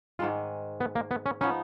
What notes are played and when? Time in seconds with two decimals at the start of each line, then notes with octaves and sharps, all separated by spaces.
0.19 G#2 D#3 G#3 F4
0.80 B3
0.95 A#3
1.11 B3
1.26 C#4
1.41 F3 B3 C#4 D#4